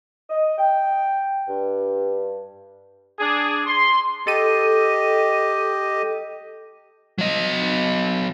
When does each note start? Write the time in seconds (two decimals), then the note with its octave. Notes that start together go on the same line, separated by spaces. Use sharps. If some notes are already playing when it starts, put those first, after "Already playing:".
0.30 D#5
0.58 G5
1.47 G2
3.19 D4 G#4
3.66 C6
4.27 G4 A4 D#5 D#7
7.18 F#3 D#5